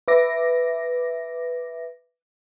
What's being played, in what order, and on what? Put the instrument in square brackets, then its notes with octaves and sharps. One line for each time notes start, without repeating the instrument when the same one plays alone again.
[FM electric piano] B4 E5 D6 A#6